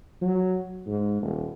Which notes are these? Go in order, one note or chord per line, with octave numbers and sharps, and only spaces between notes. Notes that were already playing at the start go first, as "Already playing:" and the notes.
F#3
G#2
D#1